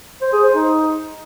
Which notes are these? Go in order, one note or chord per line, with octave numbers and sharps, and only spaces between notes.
C5
G#4
C5
D#4